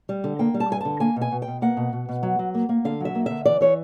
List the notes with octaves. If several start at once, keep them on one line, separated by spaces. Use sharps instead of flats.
G3
D3
A#3 G5
G3
A5
G2 G#5
D3 A5
A#3 G#5
B2
G#5
B2
G5
B2
A#3 F#5
B2
B2
B2
F#3
F#3
A#3
A#3
D3 F5
F#3 E5
A#3
D3 E5
E3 D5
E3 C#5